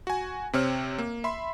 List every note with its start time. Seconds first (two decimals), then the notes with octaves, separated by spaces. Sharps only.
0.07 F#4 G#5
0.53 C3 C4 C#5 F6
0.98 A#3
1.24 E5 B5 C6